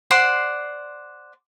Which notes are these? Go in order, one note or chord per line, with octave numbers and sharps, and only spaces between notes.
C5 D5 F#5 C6